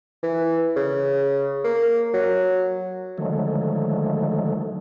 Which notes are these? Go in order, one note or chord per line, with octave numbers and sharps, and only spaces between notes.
E3
C#3
A#3
F#3
D3 D#3 F3 F#3 G#3 A3